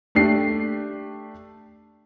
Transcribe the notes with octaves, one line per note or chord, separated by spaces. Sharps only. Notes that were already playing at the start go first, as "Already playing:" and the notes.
A3 D4 G4 C7